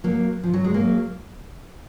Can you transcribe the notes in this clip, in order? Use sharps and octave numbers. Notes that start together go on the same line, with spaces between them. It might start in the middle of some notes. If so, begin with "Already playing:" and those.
F#3 A#3
F3
F#3
G#3
F#3 A#3